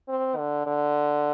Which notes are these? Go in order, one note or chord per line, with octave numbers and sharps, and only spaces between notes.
C4
D3
D3